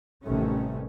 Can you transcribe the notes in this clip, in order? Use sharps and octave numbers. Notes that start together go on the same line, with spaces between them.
A1 C3 D#3 G3 A3 C#4